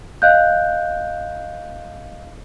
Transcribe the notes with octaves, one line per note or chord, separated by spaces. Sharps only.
D#5 F5 F#6 G6